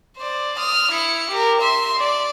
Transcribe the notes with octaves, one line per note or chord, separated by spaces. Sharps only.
C5 D5
D#6 F6
E4 C#7
G4 A#4
E5 C6
D5